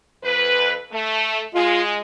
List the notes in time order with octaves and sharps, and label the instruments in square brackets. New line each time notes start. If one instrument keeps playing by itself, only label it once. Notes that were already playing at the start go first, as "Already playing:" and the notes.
[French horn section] F2 B4
A3
[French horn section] G#3 [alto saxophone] F4